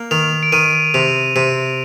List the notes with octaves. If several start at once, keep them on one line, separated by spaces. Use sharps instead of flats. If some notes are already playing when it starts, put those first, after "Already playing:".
Already playing: A#3
D#3 F7
D7
D#3 D#7
C3 F7
C3 D#7